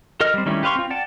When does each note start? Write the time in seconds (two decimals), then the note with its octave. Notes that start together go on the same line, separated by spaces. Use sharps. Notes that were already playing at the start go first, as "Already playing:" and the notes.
0.20 A4 A#4 D#5 F6
0.34 G3 C4
0.46 D#3 G3 A3 C#4 E4
0.63 G4 B4 F5 C6 C#6
0.75 C4 F4
0.90 D5 F#5 G5 A5